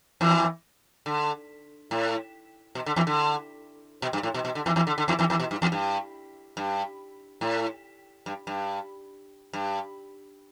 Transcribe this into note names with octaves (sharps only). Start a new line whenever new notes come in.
E2 E3
D3
A2
B2
D3
E2 E3
D3
B2
G2
A2
B2
B2
D3
E2 E3
E2 E3
D3
D3
E2 E3
E2 E3
E2 E3
B2
G2
E2
G2
G2
A2
G2
G2
G2